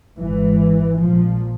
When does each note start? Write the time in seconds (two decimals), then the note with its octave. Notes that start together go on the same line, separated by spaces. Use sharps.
0.19 G#1 G#2 E3
0.97 A#1 A#2 F3